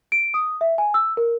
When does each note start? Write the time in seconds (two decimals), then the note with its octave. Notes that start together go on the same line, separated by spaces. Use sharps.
0.12 D7
0.34 D#6
0.61 E5
0.78 G#5
0.94 E6
1.17 A#4